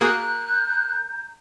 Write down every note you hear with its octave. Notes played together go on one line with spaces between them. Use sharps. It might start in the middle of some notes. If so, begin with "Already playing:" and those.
A#3 F#4 G#4 A#4 A#5 F#6 G6